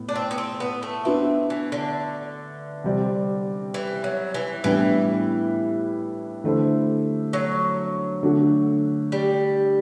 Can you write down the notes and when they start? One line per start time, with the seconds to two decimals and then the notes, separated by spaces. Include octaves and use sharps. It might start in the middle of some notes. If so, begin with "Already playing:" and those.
Already playing: A2 B3
0.09 D4
0.16 C4
0.31 B3
0.38 C4
0.60 B3
0.83 A3
1.05 B3 C4 D4 F#4 B4 E5
1.50 E3
1.72 D3
2.84 C3 G3 C4 G4 D5
3.74 E3
4.04 F#3
4.34 E3
4.64 A2 E3 G3 B3 D4
6.44 D3 A3 E4 A4 C5
7.33 F#3
8.23 D3 A3 D4 F#4
9.12 G3